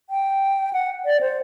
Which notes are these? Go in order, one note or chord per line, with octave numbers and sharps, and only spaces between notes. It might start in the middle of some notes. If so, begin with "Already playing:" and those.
G5
F#5
D5
C5